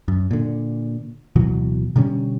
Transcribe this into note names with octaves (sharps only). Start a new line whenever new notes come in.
F#2
A#2 D3
D1 B2 E3 F#3
B2 D3 G3 C#4